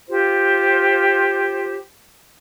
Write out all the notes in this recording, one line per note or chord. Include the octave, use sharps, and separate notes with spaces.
F4 G4 C5